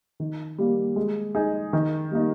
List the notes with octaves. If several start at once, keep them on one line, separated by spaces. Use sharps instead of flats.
D#3
G3 A#3
G#3
D#4 G#4
D#3
G3 A#3 D#4